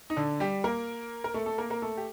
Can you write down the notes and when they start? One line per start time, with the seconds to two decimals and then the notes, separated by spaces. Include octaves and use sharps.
0.10 D#4
0.16 D3 D4
0.40 G3 G4
0.64 A#3 A#4
1.24 A#4
1.34 A3 A4
1.46 A3 A4
1.58 A#3 A#4
1.70 A#3 A#4
1.82 A3 A4
1.97 G4